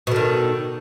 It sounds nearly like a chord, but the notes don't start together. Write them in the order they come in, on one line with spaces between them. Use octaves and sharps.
B2 D3 D#3